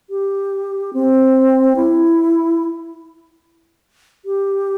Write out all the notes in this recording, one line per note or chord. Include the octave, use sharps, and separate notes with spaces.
G4
C4
E4
G4